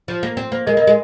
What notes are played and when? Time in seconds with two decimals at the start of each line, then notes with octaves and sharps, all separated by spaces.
0.08 F3
0.23 A#3
0.37 C4
0.52 A#3 C5
0.67 G#3 A#4 D#5
0.77 A#3 A#4 D#5
0.87 G#3